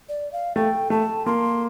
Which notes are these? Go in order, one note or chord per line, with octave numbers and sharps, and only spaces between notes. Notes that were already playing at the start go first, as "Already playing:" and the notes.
D5
F5
A3 G5
A3 A5
A#3 C6